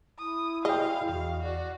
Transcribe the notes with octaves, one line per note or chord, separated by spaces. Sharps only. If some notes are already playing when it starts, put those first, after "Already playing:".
E4 D#6
G#4 D#5 F5 G5
E2 F#4 F5
F#4 D5